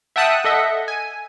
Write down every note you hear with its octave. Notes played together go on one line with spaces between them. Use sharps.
E5 F#5 G5 A5 D#6 F#6
A4 D#5 E5 F#5
G#5